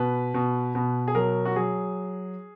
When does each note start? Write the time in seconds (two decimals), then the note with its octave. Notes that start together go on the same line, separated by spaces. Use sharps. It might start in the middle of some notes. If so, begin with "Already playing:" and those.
Already playing: B2 B4
0.34 B2
0.75 B2
1.08 G#4
1.15 F#3 A#4
1.45 F#4
1.56 F#3 G#4